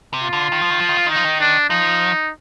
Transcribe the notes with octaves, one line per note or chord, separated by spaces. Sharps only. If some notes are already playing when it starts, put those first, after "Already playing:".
C3
F4
D3
D#3
F3
D#3
F3
D#3
F3
D#3
F3 D#4
D#3
D4
F3 D#4